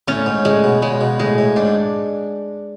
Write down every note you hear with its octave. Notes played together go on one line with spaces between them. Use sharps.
A2 C#4
G#2
A2 G#3
B2
C#3 G#3
B2
A2 G#3
A2
G#2 D4